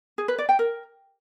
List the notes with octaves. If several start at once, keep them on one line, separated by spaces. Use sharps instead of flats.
G#4
B4
D5
G5
A#4